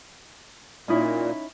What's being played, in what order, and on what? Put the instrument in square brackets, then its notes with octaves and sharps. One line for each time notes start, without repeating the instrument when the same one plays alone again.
[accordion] A#2 [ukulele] C#4 D#4 E4